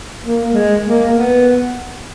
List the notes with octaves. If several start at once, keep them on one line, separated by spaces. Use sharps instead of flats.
A#3
G#3
A#3
B3